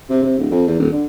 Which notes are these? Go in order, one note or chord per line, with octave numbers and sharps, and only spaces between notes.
C3
C3
D1
F2
E2
D#1
D3